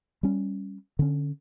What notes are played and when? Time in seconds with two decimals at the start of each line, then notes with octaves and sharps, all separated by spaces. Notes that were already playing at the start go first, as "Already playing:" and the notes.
0.23 G3 C#4
0.99 D3 C#4